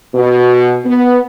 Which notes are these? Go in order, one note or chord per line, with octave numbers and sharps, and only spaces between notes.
B2
B3